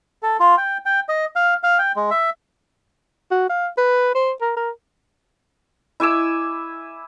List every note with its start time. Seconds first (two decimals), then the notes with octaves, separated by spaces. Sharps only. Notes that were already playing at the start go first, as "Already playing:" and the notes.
0.23 A4
0.40 F4
0.58 G5
0.86 G5
1.09 D#5
1.36 F5
1.63 F5
1.79 G5
1.96 G#3
2.11 E5
3.31 F#4
3.49 F5
3.77 B4
4.15 C5
4.41 A#4
4.57 A#4
6.00 E4 G#5 D6 E6